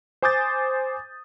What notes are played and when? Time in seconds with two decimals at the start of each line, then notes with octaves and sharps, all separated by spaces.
0.22 C5 G#5 D6 D#6 G6 A6